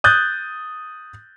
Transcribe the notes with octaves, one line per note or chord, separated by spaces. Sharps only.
D#6 F#6 G6 A6